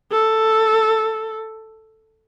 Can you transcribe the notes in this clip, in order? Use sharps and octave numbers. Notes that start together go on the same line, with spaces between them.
A4